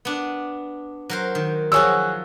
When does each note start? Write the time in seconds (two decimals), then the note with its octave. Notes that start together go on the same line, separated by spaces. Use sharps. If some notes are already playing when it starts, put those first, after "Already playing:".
0.05 B3 D4
1.10 F#3 A#4 C5
1.35 D#3
1.72 F3 F#3 F#4 G#4 C#5 E6